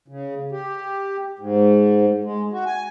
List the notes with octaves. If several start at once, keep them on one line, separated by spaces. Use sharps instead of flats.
C#3
G4
G#2
G#3
F#4
G#5